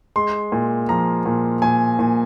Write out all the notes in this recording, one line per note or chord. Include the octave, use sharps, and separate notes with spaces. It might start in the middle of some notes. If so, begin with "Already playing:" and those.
G#3 C6
A#2
F3 A#5
A#2
A#2 G#5
A#2